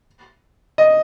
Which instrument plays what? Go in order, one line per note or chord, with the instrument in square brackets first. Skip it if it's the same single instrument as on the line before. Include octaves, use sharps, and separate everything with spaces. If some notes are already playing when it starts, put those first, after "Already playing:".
[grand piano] D#5